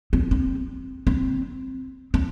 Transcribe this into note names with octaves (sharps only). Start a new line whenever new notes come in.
C4
C4
C4
C4